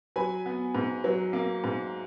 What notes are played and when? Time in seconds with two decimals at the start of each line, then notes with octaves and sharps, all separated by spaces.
0.16 F#3 G#5 B5
0.46 B3
0.75 G#2
1.04 F#3
1.33 A#3
1.64 G#2